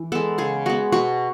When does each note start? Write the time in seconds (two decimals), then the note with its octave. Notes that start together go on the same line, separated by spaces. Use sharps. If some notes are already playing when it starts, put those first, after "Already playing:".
Already playing: E3
0.12 G#3 B3 A4
0.38 C#3 G#4
0.66 G#3 B3 F#4
0.92 B2 F#4